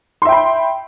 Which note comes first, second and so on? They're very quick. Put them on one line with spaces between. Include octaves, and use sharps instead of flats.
C6 E5 G5 B5